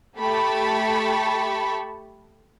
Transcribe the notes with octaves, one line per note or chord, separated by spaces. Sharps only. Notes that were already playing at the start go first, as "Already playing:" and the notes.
A3 G4 A5 B5 C#6